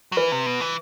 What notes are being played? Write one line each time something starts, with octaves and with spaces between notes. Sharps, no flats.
F#3
E3 B4
C3
B2
E3